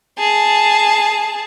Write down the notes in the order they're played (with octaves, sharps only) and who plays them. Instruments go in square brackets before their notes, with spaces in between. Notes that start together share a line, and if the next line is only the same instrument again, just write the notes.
[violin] G#4 A5